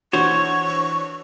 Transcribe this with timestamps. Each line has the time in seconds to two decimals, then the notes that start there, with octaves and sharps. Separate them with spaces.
0.13 E3 D4 F#4 C5 C#5 C#6 E6